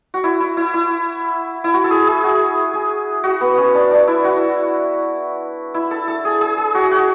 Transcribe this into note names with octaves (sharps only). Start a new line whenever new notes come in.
F#4
E4
E4
E4
E4
E4
F#4
A4
G#4
G#4
F#4
G#4
F#4
B3
C#4
D4
D4
E4
F#4
E4
A4
A4
G#4
G#4
G#4
F#4
F#4